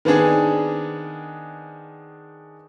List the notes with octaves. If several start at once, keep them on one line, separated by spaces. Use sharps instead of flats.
D#3 B3 C4 D4 G#4